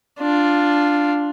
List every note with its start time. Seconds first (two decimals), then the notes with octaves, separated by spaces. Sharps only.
0.19 D4 F4